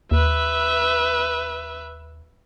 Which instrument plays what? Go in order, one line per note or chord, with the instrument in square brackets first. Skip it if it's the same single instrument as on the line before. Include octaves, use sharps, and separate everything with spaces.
[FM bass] D#2 [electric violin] B4 E5